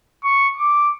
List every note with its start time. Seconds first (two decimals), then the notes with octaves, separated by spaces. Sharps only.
0.24 C#6
0.57 D6